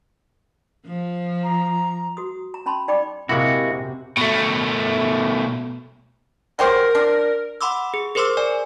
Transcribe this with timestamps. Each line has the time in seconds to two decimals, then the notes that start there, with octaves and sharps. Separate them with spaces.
0.87 F3
1.43 A#5
2.17 F#4 D#6
2.54 A#5
2.66 C#4 A5 B5 C6
2.88 D#4 D5 G5 B5 D6
3.29 C3 G#3 A#3 E4 F#4
4.17 B2 A3
6.59 F#3 G4 A#4 C5
6.95 D4
7.61 F#5 B5 C6 D6 E6
7.94 G#4
8.15 G#4 A#4 C5 C6 D6 E6
8.37 A#4 D5 G#5